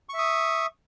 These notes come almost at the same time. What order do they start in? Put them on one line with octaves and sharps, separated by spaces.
C#6 E5 D#6